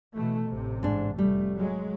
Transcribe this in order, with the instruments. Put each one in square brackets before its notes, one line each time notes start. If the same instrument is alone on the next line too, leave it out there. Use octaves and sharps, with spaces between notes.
[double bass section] B2 E3 A3
A1 C3
[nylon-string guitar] G#2 D4
[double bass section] F1 A3 [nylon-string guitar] G3
[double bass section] F#3 G#3